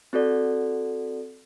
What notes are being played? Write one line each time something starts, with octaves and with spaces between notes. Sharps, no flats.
C4 F#4 A4 D5